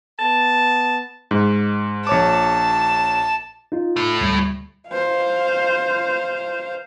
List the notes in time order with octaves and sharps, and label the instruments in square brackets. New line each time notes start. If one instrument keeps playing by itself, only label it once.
[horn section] B3 A5
[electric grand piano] G#2
[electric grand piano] A#1 C#5 D6 [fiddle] A5
[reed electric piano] D#4 F4
[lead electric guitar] A2 A3
[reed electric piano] D2 G3
[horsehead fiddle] C5 F5